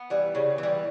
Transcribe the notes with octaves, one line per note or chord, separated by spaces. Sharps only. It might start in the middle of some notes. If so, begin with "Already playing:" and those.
Already playing: B3
E3 G3
C#3
E3 G3